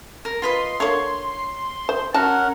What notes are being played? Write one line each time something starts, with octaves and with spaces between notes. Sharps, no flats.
A#4
F4 B4 D#5 C6
D3 A#3 C#5
C5
C#4 F#4 A#4 F#5 A5